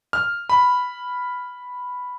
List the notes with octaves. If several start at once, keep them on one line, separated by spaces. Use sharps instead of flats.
F6
B5